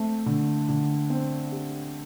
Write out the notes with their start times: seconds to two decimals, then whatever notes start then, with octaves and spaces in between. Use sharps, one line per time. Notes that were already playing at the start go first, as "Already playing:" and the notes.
Already playing: A3 C4
0.26 D3
0.69 D3
1.10 C4
1.52 G4